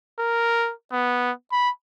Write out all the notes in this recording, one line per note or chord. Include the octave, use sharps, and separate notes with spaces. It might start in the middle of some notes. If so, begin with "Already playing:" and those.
A#4
B3
B5